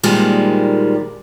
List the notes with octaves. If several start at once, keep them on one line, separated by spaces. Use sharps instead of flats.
A#2 D#3 F3 G3 G#3 A#3